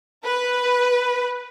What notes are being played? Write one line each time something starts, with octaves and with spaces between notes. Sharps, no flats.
B4